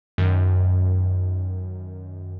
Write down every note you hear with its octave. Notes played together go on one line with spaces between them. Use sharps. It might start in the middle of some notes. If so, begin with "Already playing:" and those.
F#2 D#3